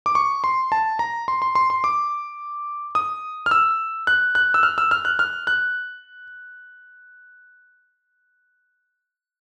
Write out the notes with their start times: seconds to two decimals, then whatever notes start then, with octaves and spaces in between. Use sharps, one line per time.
0.06 D6
0.15 C#6
0.44 C6
0.72 A5
0.99 A#5
1.28 C6
1.42 C6
1.55 C6
1.70 C6
1.84 D6
2.95 D#6
3.46 F6
3.51 E6
4.07 F#6
4.35 F#6
4.54 E6
4.63 F6
4.78 E6
4.91 F6
5.05 F#6
5.19 F6
5.47 F#6